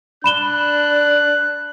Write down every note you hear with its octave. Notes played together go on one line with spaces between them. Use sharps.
D4 B5 F#6 E7 G7